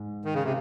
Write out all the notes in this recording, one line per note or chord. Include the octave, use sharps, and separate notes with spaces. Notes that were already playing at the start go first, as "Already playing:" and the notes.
Already playing: G#2
D#3
C#3
C3